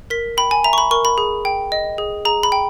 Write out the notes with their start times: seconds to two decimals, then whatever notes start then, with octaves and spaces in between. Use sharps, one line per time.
0.10 A#4 B6
0.37 G5 B5
0.51 G#5
0.64 E5 A#5
0.73 C#6
0.78 B5
0.91 A#4 C#6
1.05 B5
1.18 G#4
1.45 G5
1.72 D#5
1.98 G#4
2.25 G#4 A#5
2.43 B5
2.52 G5